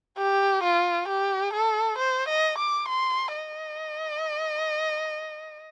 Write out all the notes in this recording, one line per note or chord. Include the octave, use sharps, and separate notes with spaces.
G4
F4
G4
A4
C5
D#5
D6
C6
D#5